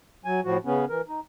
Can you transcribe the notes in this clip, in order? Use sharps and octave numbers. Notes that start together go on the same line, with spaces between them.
F#3 G#5
A2 F3 F#4
C#3 B3 C#4
E3 A#4
D#4